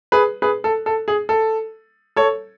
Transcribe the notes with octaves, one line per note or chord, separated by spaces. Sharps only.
G#4 B4
G#4 B4
A4
A4
G#4
A4
A4 C#5